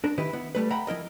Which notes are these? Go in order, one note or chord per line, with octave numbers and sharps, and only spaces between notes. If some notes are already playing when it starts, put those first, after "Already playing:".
D4 A#4
D#3 E4 G4 B4
B3 E4
G3 A3 B4
E5 F#5 G5 A#5 B5
F3 E4 A#4 D#5